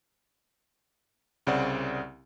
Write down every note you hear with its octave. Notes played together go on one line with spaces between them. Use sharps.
C2 C#3 C4 D5 F#5